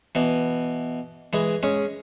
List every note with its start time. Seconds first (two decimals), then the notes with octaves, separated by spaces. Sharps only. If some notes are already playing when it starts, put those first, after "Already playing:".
0.15 B2 E3
1.33 E3 G#3
1.63 G#3 C#4